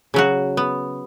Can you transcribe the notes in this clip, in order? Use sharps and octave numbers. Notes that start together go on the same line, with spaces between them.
C#3 F#3 F#4
B3